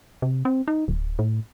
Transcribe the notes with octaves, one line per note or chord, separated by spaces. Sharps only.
C3
C4
D#4
D1
A2